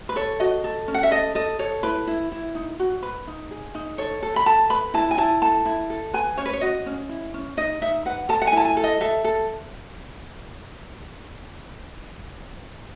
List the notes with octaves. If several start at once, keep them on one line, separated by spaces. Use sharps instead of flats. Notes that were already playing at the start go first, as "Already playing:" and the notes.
B4
A4 C#5
F#4 D#5
A4
C#4
F#5
E5
A4 D#5
A4 D#5
A4 C#5
E4 B4
E4
E4
D#4
F#4
B4
D#4
G#4
D#4
A4 C#5
A4
B5
A4 A5
B4 B5
E4 A5
G#5
E4 A5
A4 A5
E4
A4
B4 G#5
C#4 C#5
B4
C#5
F#4 D#5
C#4
E4
C#4
D#4 D#5
D#4 E5
B4 F#5
A4 A5
F#5
G#5
E4 A5
G#5
A4
D#5
A4 E5
A4